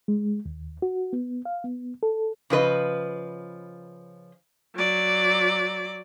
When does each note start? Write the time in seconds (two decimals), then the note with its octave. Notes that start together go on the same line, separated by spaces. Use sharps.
0.08 G#3
0.45 D#2
0.82 F#4
1.13 B3
1.45 F5
1.64 B3
2.03 A4
2.50 C#3 F3 B4 D#5
4.76 F#3 D5